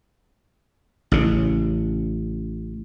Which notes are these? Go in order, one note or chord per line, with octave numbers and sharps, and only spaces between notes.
A1 C#3